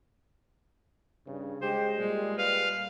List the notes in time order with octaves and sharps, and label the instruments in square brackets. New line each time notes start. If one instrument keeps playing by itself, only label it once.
[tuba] G2 [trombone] C#3
[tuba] G#3 [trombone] G4 [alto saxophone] C5
[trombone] A#2 [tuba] G3 [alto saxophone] G#3
[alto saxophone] B4 [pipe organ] F5